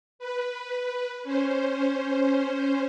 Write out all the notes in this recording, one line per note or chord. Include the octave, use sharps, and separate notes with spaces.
B4
C#4 C5